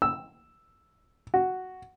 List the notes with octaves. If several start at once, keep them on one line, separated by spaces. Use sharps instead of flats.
E6
F#4